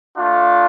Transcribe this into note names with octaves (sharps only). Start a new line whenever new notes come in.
A3 D4 F4